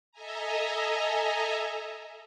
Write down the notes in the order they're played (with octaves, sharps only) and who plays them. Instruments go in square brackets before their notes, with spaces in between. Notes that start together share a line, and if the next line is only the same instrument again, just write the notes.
[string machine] A4 D#5 E5 G#5 A#5